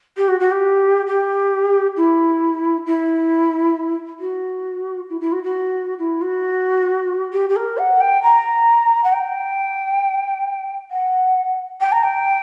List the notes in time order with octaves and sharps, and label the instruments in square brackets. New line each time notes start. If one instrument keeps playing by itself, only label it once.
[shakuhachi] G4
F#4
F#4
G4
G4
E4
E4
F#4
E4
E4
F#4
F#4
E4
F#4
G4
G4
A#4
F#5
G5
A#5
F#5
G5
F#5
G5
A#5
G5